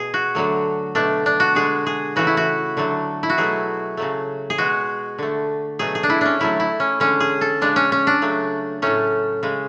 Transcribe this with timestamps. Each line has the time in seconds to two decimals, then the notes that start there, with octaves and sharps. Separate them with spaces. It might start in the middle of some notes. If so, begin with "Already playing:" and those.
Already playing: B2 G#4
0.14 F#4
0.35 D3 F#3 A3
0.95 B2 A3 D4
1.26 D4
1.40 F#4
1.55 D3 G#3 G#4
1.86 G#4
2.16 C#3 E3 A3 F#4
2.27 E4
2.37 F#4
2.77 D3 F#3 A3
3.23 E4
3.30 F#4
3.37 B2 F#3 A3 G#4
3.97 C#3 F#3 A3
4.50 G#4
4.58 B2 G#3 F#4
5.18 D3 A3
5.79 B2 F#3 A3 G#4
5.95 G#4
6.03 D4
6.10 E4
6.21 C#4 D4
6.40 D3 F#3 A3 E4
6.60 E4
6.80 C#4
7.00 D3 G#3 C#4
7.20 G#4
7.41 A4
7.61 C#3 G#3 D4
7.76 C#4
7.92 C#4
8.07 D4
8.22 C#3 F#3 A3
8.82 A2 F#3 A3 C#4
9.43 C#3 G#3